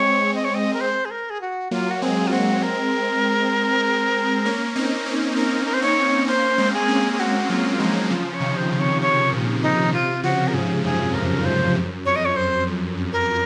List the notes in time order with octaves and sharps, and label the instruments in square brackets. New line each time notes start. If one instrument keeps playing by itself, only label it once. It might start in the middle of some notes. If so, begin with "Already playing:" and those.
Already playing: [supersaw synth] G#3 C4 [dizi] C#5
[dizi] D#5
C#5
D#5
A#4
C5
G#4
A#4
G#4
F#4
[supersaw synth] F#3 A#3 [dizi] F4
[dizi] F#4
[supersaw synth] G#3 C4 [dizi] G#4
[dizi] F4
[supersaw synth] G#3 C4 [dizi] F#4
[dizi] A#4
[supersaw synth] A#3 C#4
C4 D#4
A#3 C#4
[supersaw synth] C4 D#4 [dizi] A#4
[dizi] A#4
C5
[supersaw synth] C4 D#4 [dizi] C#5
[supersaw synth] A#3 C#4 [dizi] C5
[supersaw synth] G#3 C4
[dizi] G#4
[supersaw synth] A#3 C#4
[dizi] G#4
[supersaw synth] G#3 C4 [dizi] F#4
[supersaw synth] F#3 A#3 [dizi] F4
[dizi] F4
[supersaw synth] F3 G#3 [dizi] D#4
[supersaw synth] C#3 F3 [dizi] F4
[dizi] C#5
[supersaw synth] C3 D#3
[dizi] C5
[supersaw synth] C#3
[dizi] C#5
[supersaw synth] C3 [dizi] C#5
[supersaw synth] A#2
[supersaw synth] C3 [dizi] D#4
[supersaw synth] C3 [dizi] F4
[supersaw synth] C#3 F3 [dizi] F#4
[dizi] A#4
[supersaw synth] G#2 [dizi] G#4
[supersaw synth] F#2 [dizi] G#4
[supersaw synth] F2 [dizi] A#4
[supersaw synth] F#2 [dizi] C5
[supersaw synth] F#2
[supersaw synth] F2 [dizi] C#5
[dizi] D#5
C#5
C5
[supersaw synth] F#2
F#2
[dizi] A#4